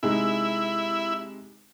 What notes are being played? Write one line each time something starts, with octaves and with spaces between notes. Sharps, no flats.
C3 G#3 D#4 E4